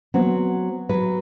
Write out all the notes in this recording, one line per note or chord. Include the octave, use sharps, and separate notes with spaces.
F#3 B3 C4
F#3 B4